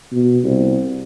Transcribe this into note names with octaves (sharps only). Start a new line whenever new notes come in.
B2
C2